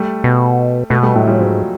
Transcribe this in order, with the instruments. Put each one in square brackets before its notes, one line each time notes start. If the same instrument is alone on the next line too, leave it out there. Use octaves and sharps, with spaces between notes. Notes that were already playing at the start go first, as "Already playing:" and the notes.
Already playing: [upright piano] G3 A3
[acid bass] B2
[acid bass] B2 [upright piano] A3 B3
[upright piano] G3 A3
[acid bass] A2 [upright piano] F#3 G#3
[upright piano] F3 G3
[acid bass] G#2 [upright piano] F#3